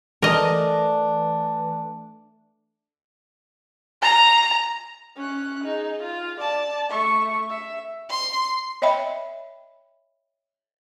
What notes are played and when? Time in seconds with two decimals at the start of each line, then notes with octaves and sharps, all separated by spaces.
0.22 E3 A3 D4 A#4 D#5
4.03 A#5
5.16 C#4 F#6
5.64 D#4 G#4
6.03 F4
6.40 D5 A5
6.89 A3 C#6
7.49 E5
8.10 C6
8.82 C#5 D#5 E5 G5 B5